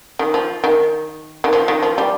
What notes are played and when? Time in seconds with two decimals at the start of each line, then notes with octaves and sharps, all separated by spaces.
0.19 D#3
0.34 F3
0.64 D#3
1.44 D#3
1.53 F3
1.68 D#3
1.83 F3
1.98 G3